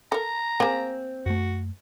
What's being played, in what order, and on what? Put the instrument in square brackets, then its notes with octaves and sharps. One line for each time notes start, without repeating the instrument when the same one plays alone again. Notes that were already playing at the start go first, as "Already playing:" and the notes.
[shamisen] A4 A#4 [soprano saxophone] A#5
[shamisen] A#3 G#4 [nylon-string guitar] C4
[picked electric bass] F#2 A3 [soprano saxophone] F#4